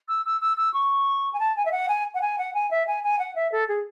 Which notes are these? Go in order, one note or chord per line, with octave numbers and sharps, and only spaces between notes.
E6
E6
E6
E6
C#6
G#5
A5
G#5
E5
F#5
G#5
F#5
G#5
F#5
G#5
E5
G#5
G#5
F#5
E5
A4
G#4